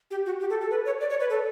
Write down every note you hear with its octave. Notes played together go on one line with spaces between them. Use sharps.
G4
F#4
G4
A4
A4
B4
C#5
D5
C#5
B4
A4